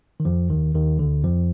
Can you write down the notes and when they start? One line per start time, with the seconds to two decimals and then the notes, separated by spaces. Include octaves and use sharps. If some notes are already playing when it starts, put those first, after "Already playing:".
0.20 D#3
0.25 F2 F3
0.50 D#2 D#3
0.74 D#2 D#3
0.99 D2 D3
1.24 F2 F3